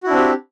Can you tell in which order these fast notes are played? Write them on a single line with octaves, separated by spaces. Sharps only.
F#4 E4 D4 C4 G4